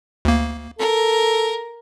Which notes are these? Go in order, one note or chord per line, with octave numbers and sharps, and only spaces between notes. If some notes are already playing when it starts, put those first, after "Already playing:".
D2 A#3
A4 A#4